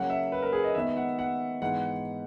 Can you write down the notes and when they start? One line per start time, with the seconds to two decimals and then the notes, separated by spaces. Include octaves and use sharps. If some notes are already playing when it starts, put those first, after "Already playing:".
Already playing: C#3 F#3 A#3 C#4 F#5
0.10 E5
0.32 B4
0.42 A#4
0.53 G#4
0.64 D#5
0.75 D#3 G#3 B3 D#4 E5
0.97 F#5
1.19 F#5
1.61 G#2 E3 B3 D#4 F#5